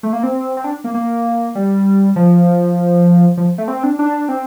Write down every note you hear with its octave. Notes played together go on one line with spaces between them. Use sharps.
A3
A#3
C4
C4
D4
A#3
A#3
G3
F3
F3
A3
C4
D4
D4
C4